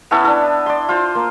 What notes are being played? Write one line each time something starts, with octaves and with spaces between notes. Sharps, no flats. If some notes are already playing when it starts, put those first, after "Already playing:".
B3 C#4 E4 A4
D4 A4
D5 C6
F4 C5
A#3